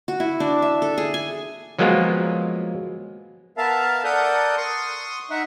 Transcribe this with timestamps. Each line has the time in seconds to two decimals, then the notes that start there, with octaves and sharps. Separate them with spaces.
0.08 F#4
0.20 E4
0.40 D4
0.62 E5
0.82 A4
0.98 G#4
1.14 G#5
1.79 F3 F#3 G#3 A#3 B3 F4
3.58 B3 A#4 E5 F5 A5
4.04 A4 A#4 D5 F#5 D#6 G6
4.57 C6 C#6 D#6
5.30 D#4 E5 F#5